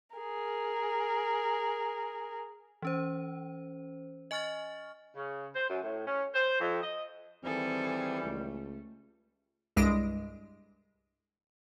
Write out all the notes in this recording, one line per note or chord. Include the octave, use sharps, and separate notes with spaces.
G#4 A#4
E3 C#4 C5
D#5 G#5 C#6 F6 A6
C#3
C5
F#2
A2
C#4
C5
F2
D#5
D#3 E3 G3 C4 G#4 A4
C#2 A3
C2 G2 G#3 A#6 D7